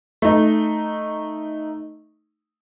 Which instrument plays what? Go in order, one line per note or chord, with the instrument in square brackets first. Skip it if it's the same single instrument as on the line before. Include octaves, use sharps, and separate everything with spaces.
[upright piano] A3 D#4